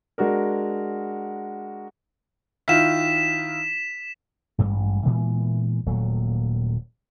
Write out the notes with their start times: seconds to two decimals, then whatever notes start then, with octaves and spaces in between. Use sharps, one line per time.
0.18 G#3 D4 F#4 A#4
2.68 D#3 E4 F4 B6 E7
4.58 A1 G2 G3 G#3
5.05 A#2 E3 G#3 B3
5.87 D#1 A#2 F#3 A3